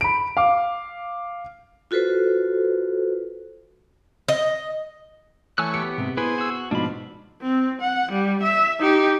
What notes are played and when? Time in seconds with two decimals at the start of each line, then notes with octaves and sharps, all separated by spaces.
0.01 B5 D7
0.37 F5 D6
1.91 F4 F#4 A4 B4 C5
4.28 D#5
5.58 E3 A3 C#5 G#5 E6 F#6
5.74 B3 G4 C#7
5.98 G#2 C3
6.17 B3 E4 G#4 B4 C5 G#5
6.38 F#4 E6
6.71 G#2 B2 F3 D4 B5
7.41 C4
7.81 F#5
8.12 G3
8.43 E5
8.80 D#4 G4